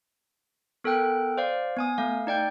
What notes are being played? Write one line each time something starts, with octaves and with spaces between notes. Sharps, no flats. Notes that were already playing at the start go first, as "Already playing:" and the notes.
B3 A4 A#4 G5 F#6
C5 D5 F5
B3 G#5 D#6
A3 F5
D#4 D5 G5 G6